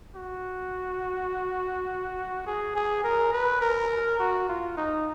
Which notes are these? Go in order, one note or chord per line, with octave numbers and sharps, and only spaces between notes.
F#4
G#4
G#4
A#4
B4
A#4
F#4
F4
D#4